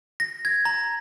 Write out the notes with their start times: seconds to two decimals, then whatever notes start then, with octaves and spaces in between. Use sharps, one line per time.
0.20 A#6
0.45 G#6
0.65 A#5